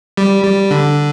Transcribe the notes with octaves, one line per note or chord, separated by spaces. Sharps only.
G3
G3
D3